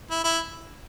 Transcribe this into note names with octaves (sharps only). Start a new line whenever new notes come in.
E4
E4